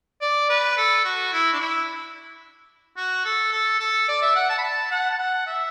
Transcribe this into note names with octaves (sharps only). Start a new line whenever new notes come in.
D5
B4
A4
F#4
E4
D4
E4
F#4
A4
A4
A4
D5
E5
F#5
A5
B5
A5
F#5
A5
F#5
E5